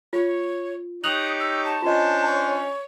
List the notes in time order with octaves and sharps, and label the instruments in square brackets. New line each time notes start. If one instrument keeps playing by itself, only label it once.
[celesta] F4 [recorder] C#5
[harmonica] D#4 G4 C#5 [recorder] D#6 [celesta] F#6 F7 F#7
[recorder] E6
A5
[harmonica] C#4 D4 C5 [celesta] F4 D#5
[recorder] C#5